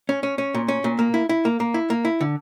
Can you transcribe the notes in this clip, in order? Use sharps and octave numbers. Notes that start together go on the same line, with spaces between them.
C#4
C#4
C#4
A#2
C#4
A#2
A#3
E4
E4
A#3
A#3
E4
A#3
E4
D3